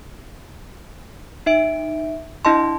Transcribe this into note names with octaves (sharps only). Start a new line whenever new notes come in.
D#4 E5 D7
D4 E4 D#5 A5 C6